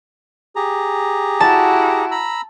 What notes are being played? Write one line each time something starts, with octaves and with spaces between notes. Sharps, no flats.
G4 G#4 A#5
E4 F#4 A5
A#5 B5 E6